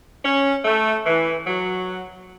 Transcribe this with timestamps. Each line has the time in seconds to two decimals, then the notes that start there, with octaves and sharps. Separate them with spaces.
0.24 C#4
0.65 A3
1.06 E3
1.47 F#3